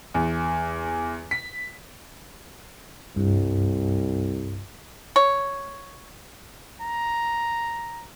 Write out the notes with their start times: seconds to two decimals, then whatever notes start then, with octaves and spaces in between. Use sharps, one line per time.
0.14 E2
1.31 B6
3.17 C2 G2
5.16 C#5
6.82 A#5